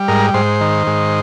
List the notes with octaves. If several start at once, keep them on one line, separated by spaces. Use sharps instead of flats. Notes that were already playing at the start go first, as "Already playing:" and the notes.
Already playing: G3
G#2 A#4
G#2 C5
D#3
G#2